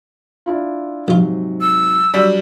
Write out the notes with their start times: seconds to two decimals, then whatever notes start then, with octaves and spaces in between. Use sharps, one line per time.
0.46 D4 E4 F4
1.08 A#1 G#2 C3 F#3 F4
1.61 E6
2.14 F#3 G3 D4